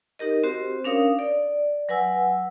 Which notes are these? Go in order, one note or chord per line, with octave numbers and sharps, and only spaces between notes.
D#4 G4 A#4 D#5
C4 F#4 G4 C5
C#4 D4 A#4 C#5 F5 D#6
D5
F#3 B4 F#5 G#5 E6